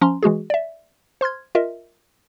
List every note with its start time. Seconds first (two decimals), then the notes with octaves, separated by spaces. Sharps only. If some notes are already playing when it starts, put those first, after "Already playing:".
0.01 F3 C#4 A#5 C6
0.23 E3 G#3 F#4 G#4
0.50 D5 E5
1.21 C5 C6 F6 G#6
1.55 F4 A#4 D#5 E5